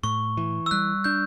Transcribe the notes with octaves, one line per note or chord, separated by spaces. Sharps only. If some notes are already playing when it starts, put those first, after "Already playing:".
A2 C#6
E3
E6
G3 F#6
D4 G6